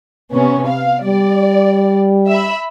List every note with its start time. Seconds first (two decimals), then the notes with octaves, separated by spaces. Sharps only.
0.33 C3 B3 C#4
0.67 F5
1.04 G3 D5
2.29 E5 B5